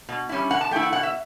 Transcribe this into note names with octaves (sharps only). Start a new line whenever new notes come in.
B2
G3 C#4 E4
B2 F#5
A5
A3 E4 G5
F#5
B2 F#5
E5